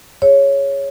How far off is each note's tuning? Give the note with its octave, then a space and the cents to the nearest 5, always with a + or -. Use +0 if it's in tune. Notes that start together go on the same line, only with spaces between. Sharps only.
G#4 +0 C#5 +0